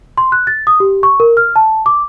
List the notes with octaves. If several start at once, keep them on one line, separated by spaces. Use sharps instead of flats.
C6
F#6
A6
D#6
G4
C#6
A#4
F6
A5
D6